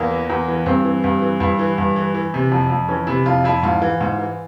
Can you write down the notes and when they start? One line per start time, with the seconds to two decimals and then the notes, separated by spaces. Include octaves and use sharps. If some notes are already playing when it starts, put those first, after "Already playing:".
Already playing: E2 A#3
0.11 E3
0.30 E2
0.48 E3
0.66 G2 C4
0.85 E3
1.04 G2
1.22 E3
1.40 G2 E4
1.59 E3
1.78 G2
1.96 E3
2.14 E3
2.34 C3
2.52 F2
2.70 F2
2.88 E3 C#4
3.07 C3 E4
3.26 F2 F4
3.44 F2 E4
3.63 G#2 F4
3.82 E3
4.01 G#2
4.19 E3